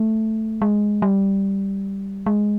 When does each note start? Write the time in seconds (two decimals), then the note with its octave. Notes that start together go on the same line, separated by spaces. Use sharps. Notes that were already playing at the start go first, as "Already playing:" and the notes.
Already playing: A3
0.62 G#3
1.02 G3
2.26 G#3